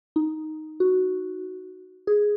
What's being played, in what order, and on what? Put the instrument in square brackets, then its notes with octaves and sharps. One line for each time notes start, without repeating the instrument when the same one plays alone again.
[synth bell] D#4
F#4
G#4